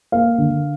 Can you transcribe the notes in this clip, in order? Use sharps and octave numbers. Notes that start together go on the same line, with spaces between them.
A#3 F5
D3